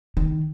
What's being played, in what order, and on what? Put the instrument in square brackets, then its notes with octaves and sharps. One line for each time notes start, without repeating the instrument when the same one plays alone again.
[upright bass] D#3